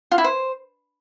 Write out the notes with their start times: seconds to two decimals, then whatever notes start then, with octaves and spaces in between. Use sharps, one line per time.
0.12 F4
0.18 E4
0.24 C5